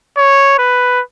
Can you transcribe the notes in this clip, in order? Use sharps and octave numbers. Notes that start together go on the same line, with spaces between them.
C#5
B4